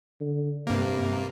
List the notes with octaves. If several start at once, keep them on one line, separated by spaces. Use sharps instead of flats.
D3
G2 C3 A#3